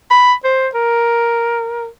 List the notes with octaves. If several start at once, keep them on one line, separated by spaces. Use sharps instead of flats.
B5
C5
A#4